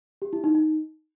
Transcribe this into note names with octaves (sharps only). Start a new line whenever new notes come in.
G4
E4
D#4
D#4